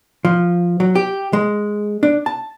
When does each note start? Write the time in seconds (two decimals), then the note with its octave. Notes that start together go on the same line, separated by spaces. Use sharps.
0.25 F3
0.80 F#3
0.95 G4
1.33 G#3
2.03 D4
2.26 A5